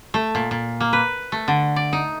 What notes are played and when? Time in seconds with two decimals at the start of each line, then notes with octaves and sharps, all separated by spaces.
0.14 A3
0.35 A#2
0.51 A#2
0.80 A#3
0.93 B4
1.32 A3
1.48 D3
1.76 D5
1.93 D#4